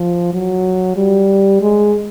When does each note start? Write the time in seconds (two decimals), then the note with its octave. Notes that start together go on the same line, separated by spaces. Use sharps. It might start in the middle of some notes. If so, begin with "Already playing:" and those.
Already playing: F3
0.33 F#3
0.97 G3
1.61 G#3